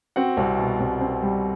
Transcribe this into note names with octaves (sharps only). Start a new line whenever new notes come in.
C4 F#4 F#5
C2
B2
C2
C4
G3